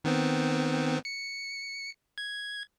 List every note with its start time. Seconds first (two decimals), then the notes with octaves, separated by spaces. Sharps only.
0.04 D#3 B3 C4
1.05 C#7
2.18 G#6